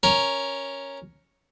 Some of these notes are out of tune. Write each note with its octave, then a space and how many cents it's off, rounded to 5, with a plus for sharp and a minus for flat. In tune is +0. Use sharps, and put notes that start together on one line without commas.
C#4 +0 A#4 +0